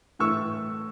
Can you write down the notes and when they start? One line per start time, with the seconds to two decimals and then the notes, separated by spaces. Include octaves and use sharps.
0.19 A2 E3 A3 C#6 E6